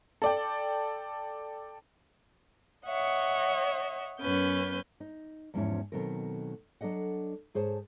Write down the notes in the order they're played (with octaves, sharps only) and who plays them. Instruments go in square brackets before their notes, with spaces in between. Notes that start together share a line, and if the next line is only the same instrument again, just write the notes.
[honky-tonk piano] A4 D5 G5
[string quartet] C#5 D#5 E5 F#5
F#2 B3 C#4 B4 G6
[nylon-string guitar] D#4
E2 G#2 F3 C#4 E4 C#5
B2 D#3 F#3 C4 A4 A#4
F#3 D4 A4 D#5 F#5
G#2 G#4 C5 C#5 A5